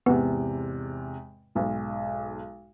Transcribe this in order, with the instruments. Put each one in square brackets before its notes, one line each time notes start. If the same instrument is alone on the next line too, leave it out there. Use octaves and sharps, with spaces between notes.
[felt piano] E2 G#2 C3 [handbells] B3 B4
[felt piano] B1 G#2